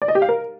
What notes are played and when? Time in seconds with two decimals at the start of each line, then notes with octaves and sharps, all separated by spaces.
0.02 D5
0.08 D#5
0.15 G4
0.22 F5
0.29 A#4